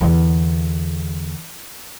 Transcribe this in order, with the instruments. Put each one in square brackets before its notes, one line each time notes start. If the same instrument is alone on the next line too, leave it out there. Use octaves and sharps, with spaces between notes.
[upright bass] E2 D3